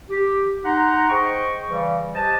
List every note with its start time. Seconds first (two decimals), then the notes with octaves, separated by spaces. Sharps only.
0.10 G4
0.65 D#4 F#5 A#5 C6
1.09 G#4 C5 D#5 G5 C#6
1.68 C#3 E3 G3
2.14 G4 B4 C5 D#5 A5